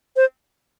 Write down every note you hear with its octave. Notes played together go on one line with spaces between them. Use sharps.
C5